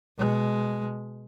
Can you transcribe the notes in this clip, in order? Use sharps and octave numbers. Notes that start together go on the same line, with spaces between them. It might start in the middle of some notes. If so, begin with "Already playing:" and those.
B2 G#3